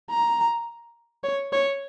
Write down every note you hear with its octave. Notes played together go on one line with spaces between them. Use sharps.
A#5
C#5
C#5